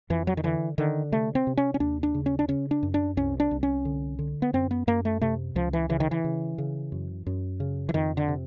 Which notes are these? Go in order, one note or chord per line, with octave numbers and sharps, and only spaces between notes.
F2 E3
F#3
D#3
D3 E3
D3 D#3
C3 A3
C4
C3
C#4
C#4
D#2 D4
D4
C#3
C#4
D4
C#3 C#4
D4
F#2
D4
C2 C#4
D4
C2
C#4
D3
D3
B3
F#2 C4
B3
F#2 A#3
A3
C3 A3
C#2 F3
E3
C#3 E3
D#3
E3
C#3
C#3
F#2
F#2
C#3
E3
F2 D#3
D3
C3